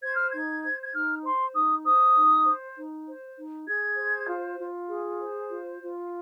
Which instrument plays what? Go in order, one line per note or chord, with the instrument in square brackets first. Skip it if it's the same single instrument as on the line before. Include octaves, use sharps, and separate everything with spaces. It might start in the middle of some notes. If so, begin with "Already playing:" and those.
[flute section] C5 G#6
F6
D#4 G#6
C5
G#6
D#4 F6
C5 C6
D#4 D#6
C5 D#6
D#4
C5
D#4
C5
D#4
G#4 G#6
C5
F4
F4
G#4
C5
F4
F4